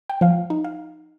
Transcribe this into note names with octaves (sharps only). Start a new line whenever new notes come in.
G5
F3 F5
D#4
F5